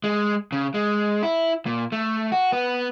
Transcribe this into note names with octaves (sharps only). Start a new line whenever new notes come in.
G#3
C#3
G#3
E4
A#2
A3
F#4
B3